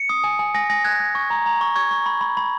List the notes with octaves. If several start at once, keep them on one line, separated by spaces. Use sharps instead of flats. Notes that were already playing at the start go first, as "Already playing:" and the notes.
Already playing: C#7
D#6
G#5
G#5
G#5 A#6
G#5 A#6
F#6 G#6
F#6
C#6
A#5
A#5
C#6
C#6 G#6
C#6
B5
B5
B5